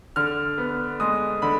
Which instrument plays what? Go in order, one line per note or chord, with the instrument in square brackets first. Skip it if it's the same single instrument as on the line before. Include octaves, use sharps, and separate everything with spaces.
[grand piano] D3 F6
B3
G#3 D#6
D3 B5